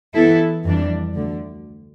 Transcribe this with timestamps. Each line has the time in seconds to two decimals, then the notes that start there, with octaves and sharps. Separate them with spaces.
0.14 E3 B3 E4 A4
0.64 F2 E3 G3 D4
1.15 D2 D3